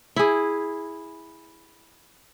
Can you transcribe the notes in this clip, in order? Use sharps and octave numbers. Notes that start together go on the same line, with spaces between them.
E4 G#4